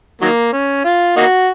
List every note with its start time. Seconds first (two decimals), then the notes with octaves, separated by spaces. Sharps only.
0.21 D#3 F#3 A#3
0.52 C#4
0.84 F4
1.16 A#3 D#4 F#4